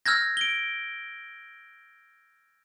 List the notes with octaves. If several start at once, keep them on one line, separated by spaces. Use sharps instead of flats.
E6 F6 G6 G#6 A#6
D7 G7